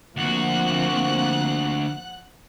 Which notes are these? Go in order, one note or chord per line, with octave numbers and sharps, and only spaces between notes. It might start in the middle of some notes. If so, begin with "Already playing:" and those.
D2 F3 A#3 C4 F#4 F#5 F#6